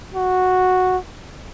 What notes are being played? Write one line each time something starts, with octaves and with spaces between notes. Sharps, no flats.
F#4